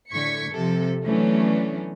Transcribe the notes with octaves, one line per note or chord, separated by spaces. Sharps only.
A2 D3 C#6 G#6 B6 C#7
C3 F3 A4
E3 F#3 A3 B3 C#4 D4